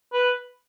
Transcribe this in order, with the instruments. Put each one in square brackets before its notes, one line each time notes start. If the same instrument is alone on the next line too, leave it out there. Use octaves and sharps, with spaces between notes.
[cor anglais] B4